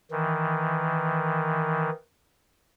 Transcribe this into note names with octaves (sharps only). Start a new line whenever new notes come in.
D#3 E3